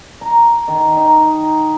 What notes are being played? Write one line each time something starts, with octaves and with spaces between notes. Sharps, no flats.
A#5
D#3
D#4